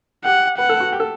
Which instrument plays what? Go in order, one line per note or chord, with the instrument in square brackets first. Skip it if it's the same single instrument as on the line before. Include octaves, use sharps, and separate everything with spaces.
[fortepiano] G4 [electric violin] F#5
[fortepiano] B4 [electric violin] F#5
[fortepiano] A4
F#4
G4
A4